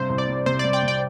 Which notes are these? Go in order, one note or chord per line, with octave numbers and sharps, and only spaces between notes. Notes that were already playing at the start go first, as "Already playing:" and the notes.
Already playing: G2 C3 C5
C2
D5
G3
C3 C5
G3 D5
D5 G5
C3
D5 G5